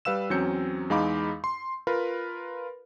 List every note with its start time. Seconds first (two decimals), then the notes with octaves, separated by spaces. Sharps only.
0.05 G3 B4 F5 E6 E7
0.30 E2 F#3 C4 C#4 G6 C#7
0.90 E2 G#3 D#4 F5 B5 D6
1.44 C6
1.87 F4 A#4 B4 B5